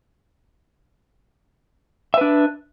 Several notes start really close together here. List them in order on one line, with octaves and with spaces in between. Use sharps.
E5 B4 D4